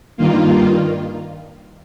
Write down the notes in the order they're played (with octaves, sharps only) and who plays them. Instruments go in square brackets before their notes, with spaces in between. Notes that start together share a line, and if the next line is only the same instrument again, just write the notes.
[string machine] G2 D#3 A#3 F4